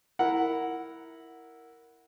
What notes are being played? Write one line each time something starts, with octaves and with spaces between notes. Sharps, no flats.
E4 A#4 F#5